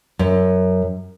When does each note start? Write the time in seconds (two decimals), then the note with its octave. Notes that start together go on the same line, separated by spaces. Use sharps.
0.19 F#2